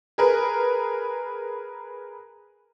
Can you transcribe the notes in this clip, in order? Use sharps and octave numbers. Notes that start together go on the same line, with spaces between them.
G#4 A#4 B4